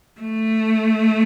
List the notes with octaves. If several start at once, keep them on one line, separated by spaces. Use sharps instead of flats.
A3